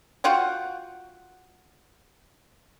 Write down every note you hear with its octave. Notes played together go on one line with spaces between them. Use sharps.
F4 F#4 F#5 G5